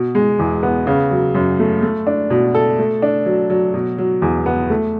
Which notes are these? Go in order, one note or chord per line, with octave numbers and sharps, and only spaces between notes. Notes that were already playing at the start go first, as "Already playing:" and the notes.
Already playing: B2
G#3
E2
B3
C#3
F#3
F#2
A3
A3
D4
B2
A4
A3
D4
F#3
F#3
B2
F#3
E2
B3
A3